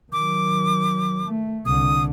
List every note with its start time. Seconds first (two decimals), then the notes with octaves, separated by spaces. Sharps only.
0.13 D#3 F#3 D6
1.26 A3
1.66 C2 D3 D#6